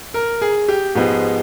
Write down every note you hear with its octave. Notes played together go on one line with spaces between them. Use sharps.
A#4
G#4
G4
G#2 F3 G#3 B3 G4